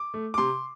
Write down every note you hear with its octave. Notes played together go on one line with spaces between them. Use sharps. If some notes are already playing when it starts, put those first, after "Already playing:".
Already playing: D6
A3
D6
C3 C6